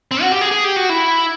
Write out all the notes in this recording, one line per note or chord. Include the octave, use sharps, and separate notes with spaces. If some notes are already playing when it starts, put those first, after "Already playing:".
C4
F#4
G4
G#4
G#4
G4
F#4
E4